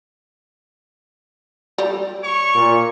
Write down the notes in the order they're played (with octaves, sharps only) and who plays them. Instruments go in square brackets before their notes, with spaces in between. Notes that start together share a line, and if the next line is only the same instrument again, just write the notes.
[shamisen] G3
[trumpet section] C#5 C#6
[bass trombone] A#2